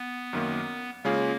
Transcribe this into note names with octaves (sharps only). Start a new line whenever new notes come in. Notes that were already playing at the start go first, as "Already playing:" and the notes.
Already playing: B3
F#2 D#3 A#3
C#3 G#3 A#3 C#4 F4 G#4